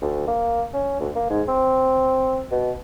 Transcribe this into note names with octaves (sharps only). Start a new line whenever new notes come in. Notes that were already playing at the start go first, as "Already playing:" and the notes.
D2
A#3
C#4
D2
A#3
G#2
C4
B2